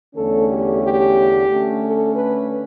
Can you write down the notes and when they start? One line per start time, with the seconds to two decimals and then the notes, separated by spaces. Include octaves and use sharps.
0.15 E2 D3 A3 C#4 A4
0.48 G4
0.82 G4
1.49 D3 A3 C#4
1.83 A4
2.16 B4